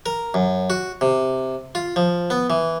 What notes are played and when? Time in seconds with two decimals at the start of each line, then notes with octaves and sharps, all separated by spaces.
0.06 A#4
0.34 F#2
0.70 F#4
1.01 C3
1.75 F4
1.96 F3
2.30 B3
2.50 E3